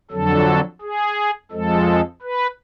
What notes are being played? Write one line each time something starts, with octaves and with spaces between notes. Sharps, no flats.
F2 D3 F#3 A4
G#4
F2 F3 G#3 A4
B4